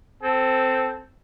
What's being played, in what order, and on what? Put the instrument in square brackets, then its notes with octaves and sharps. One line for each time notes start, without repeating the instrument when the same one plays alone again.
[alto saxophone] C4 [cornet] A4